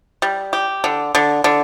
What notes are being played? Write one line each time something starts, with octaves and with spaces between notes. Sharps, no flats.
G3
G4
D3
D3
D3